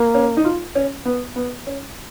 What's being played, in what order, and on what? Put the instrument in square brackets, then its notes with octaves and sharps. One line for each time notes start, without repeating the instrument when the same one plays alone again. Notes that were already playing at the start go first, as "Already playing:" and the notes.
Already playing: [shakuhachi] A#3
[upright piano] C#4
D#4
F4
C#4
B3
B3
C#4